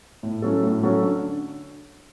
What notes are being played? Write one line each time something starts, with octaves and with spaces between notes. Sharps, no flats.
A2
F#3 C#4 F#4 A4
A2
F#3 C#4 F#4 A4
D3